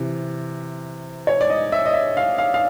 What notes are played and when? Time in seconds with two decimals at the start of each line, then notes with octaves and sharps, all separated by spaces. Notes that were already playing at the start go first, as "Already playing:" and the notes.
Already playing: C3 E3
1.27 C#5
1.41 D5
1.50 D#5
1.72 E5
1.86 D#5
1.93 E5
2.17 F5
2.38 F5
2.54 F5